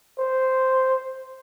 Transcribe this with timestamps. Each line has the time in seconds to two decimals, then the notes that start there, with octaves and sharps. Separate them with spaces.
0.19 C5